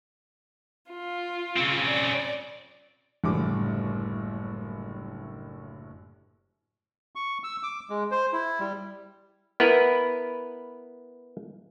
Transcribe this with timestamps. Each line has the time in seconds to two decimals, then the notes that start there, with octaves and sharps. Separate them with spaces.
0.91 F4
1.57 C#3 C4
1.87 D5
3.24 F#1 A2 D3 G3 D6
7.15 C#6
7.44 E6
7.63 D6
7.90 G#3
8.11 C5
8.33 E4
8.60 G3
9.60 B3 E4 A#4 B4